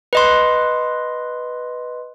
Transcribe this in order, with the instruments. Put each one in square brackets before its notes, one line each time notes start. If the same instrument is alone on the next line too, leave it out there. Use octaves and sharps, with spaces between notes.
[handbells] B4 D#5 C6